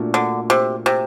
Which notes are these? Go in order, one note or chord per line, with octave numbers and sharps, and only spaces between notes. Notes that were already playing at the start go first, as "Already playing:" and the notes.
Already playing: A#2 A3 D4 F#4
D3
C3
C3